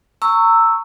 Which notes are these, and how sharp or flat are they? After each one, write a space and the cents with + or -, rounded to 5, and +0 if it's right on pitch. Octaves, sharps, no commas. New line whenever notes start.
A#5 -30 C#6 +0 E6 +0